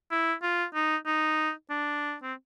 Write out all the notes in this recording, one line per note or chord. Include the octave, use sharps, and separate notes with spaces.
E4
F4
D#4
D#4
D4
C4